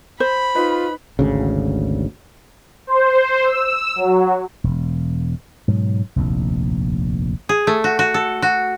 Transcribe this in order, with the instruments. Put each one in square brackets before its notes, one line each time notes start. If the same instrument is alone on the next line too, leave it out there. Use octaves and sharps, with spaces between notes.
[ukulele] C5 [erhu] B5
[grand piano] D#4 B4 [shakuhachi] F4
[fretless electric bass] G#1 D2 C#3
[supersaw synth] C5
E6
F#3
[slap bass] E1
G#2 B2 F#3
F1 A#1 D#2
[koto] G#4
A3
F#4
F#4
A4
F#4